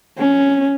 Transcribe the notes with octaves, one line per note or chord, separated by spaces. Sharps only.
C#4